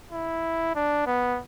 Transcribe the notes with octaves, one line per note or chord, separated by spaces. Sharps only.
E4
D4
B3